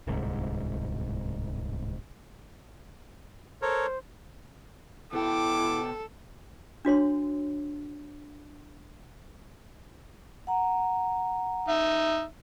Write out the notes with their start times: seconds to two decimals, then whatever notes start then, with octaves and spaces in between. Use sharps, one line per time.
0.07 D1 C2 G#2
3.62 A4 A#4 C5 C#5
5.13 B2 E4 A4 G5 D6
6.85 D4 F#4 C#5 C6
10.47 F#5 A#5
11.69 D#4 E5